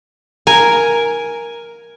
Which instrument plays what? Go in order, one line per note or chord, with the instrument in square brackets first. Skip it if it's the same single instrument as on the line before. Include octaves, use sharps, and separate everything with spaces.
[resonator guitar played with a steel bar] A#4 [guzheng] G#5